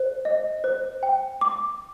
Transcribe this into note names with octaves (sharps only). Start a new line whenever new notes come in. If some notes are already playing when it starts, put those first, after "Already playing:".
Already playing: C5
D#5
C5
G5
D6